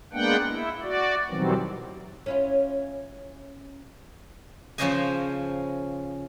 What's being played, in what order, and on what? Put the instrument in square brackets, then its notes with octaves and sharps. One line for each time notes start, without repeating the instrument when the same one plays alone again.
[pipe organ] G#3 A#3 B3 D4 F#5 G5
E4
F#4 D5
B2 D#3 E3 F#3 G3 C4
[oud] C#4 E4 F4
[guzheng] C#3 F3 C#4 C5 D#5 G#5